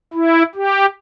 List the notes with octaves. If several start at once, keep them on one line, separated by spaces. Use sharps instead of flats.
E4
G4